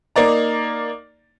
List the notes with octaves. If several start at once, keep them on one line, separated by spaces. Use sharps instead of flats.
A#3 D#4 D5 A#5